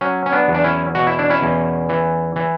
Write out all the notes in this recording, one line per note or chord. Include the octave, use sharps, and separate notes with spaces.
F#3 C#4
C#4
B3 D4
E2
D4
C#4 E4
B2 F#4
E4
D4
C#4 E4
E2
E3
E3